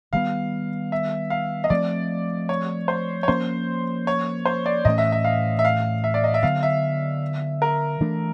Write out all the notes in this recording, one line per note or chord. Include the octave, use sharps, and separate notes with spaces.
D#3 G3 B3 F5
E5
F5
D#5
F3 A3 C4 D5
C#5
C5
C#5
F3 A#3 C#4 C5
C#5
C5
D5
A2 E3 A3 C#4 D#5
E5
E5
F5
E5
F5
E5
D5
D#5
E5
D3 F#3 B3 F5
E5
A#4
E3 A3 D4